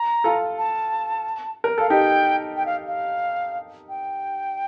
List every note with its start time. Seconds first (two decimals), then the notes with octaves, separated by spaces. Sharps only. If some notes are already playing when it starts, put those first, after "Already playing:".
Already playing: A#5
0.24 F4 A4
0.58 A5
1.64 A#4
1.78 A4 F5
1.90 D#4 G4 G5
2.57 G5
2.66 F5
2.87 F5
3.89 G5